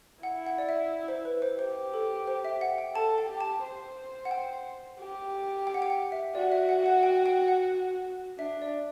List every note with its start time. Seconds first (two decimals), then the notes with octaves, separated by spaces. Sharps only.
0.23 E4 F#5
0.47 F#5
0.58 D5
0.69 E5
1.08 C5
1.25 B4
1.42 C5
1.59 G4 C5
1.94 A4
2.27 C5
2.45 E5
2.61 F#5
2.78 G5
2.95 A4 A5
3.18 G5
3.29 G4
3.41 A5
3.63 C5
4.25 F#5
4.31 G5
4.99 G4
5.67 G5
5.74 F#5
5.82 G5
5.90 F#5
6.12 E5
6.35 F#4 D5
6.52 E5
6.69 F#5
6.86 F#5
7.03 G5
7.26 G5
7.48 F#5
8.39 D4 E5
8.62 D5